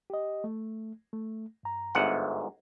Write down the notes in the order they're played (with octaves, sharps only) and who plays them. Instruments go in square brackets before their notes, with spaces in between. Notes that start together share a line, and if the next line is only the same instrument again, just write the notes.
[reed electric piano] G4 D#5
A3
A3
G2 A#5
[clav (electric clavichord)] G1 G#2 F#5 [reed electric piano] D#4 E5